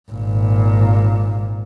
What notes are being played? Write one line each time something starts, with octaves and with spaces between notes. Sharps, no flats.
G#1 A#2